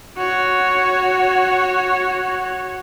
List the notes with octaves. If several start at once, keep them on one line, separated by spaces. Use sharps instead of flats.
F#4 C#5